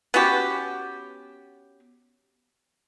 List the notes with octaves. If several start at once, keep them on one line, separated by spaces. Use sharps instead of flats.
B3 C#4 F#4 G4